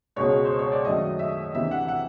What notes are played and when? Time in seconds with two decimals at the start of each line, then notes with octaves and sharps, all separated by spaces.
0.16 C#2 B2 G#3 C#5
0.45 C5
0.59 C#5
0.72 D5
0.85 F#2 D#3 F#3 A3 D#5
1.19 E5
1.55 D2 C3 E3 E5
1.71 F#5
1.88 F#5